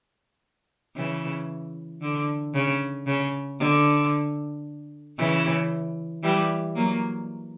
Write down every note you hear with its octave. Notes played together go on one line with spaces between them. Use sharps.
C#3 E3
D3
C#3
C#3
D3
C#3 E3
E3 G3
F#3 A#3